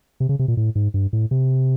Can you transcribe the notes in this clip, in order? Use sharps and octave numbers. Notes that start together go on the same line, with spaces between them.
C3
C#3
C3
A#2
A2
G#2
G2
A2
C3